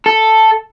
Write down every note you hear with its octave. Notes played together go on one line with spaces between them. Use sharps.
A4